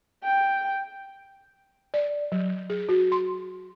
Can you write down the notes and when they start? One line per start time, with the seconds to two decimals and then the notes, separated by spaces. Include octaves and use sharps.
0.24 G5
1.94 D5
2.32 F#3
2.70 G#4
2.89 F#4
3.12 C6